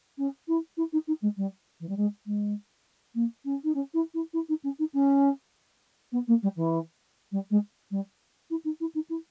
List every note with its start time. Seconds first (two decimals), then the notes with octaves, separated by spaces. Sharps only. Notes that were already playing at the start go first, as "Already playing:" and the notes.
0.18 C#4
0.48 E4
0.77 E4
0.93 D#4
1.07 D#4
1.22 G#3
1.37 G3
1.80 E3
1.89 G3
1.97 G#3
2.26 G#3
3.15 A#3
3.45 C#4
3.64 D#4
3.75 C#4
3.94 E4
4.14 E4
4.33 E4
4.49 D#4
4.64 C#4
4.79 D#4
4.94 C#4
6.12 B3
6.28 A#3
6.43 G3
6.56 E3
7.32 G3
7.51 G#3
7.91 G3
8.50 E4
8.65 D#4
8.80 E4
8.95 D#4
9.10 E4